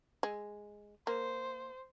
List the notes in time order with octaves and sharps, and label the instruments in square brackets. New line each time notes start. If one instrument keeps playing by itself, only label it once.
[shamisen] G#3
[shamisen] A#3 [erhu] C5